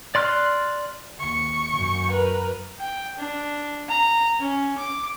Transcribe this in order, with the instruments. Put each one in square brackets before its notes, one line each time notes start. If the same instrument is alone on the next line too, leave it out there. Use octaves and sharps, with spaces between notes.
[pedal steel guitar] D5 C6 F6 F#6
[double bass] D#2 [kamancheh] C#6
[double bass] F#2
[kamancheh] A#4 B4
G5
D4
A#5
C#4
D6